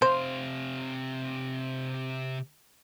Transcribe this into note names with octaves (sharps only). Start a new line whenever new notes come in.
C3 C5 F5